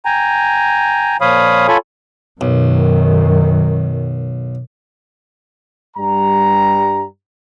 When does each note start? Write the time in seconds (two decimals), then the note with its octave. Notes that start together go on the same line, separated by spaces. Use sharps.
0.05 G5 G#5 A#5
1.21 A#2 F3 C#5 F5 B5 D#6
1.68 F4 A4 C#5 G#5 B5 C#6
2.41 B1 F#2 D#3
5.97 G2 G3 A#5